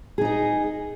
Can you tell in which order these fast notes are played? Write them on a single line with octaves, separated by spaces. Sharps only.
G#4 D#4 D#5